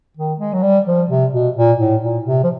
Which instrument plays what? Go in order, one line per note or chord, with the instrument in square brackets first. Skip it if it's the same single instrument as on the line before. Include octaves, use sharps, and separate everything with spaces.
[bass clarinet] D#3
G#3
F#3
G3
F3
C3
B2
A#2
A2
A#2
C3
F3